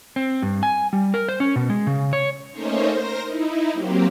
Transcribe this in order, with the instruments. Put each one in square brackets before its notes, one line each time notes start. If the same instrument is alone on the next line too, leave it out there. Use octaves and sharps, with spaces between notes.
[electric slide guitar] C4
G2
G#5
G3
A#4
C5
C#4
B2
G#3
C#3
C#5
[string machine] A3 A#3 C#4 D#4 C5 C#5
A#4 C5 A#6
D#4 E4
F#3 A#3 C4 G4